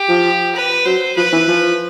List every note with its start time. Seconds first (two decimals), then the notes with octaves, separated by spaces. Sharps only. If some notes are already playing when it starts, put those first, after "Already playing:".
Already playing: G4
0.09 F3
0.55 B4
0.86 F#3 C5
1.17 F3 B4
1.33 E3
1.48 F3